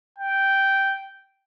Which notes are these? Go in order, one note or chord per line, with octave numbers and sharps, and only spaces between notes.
G5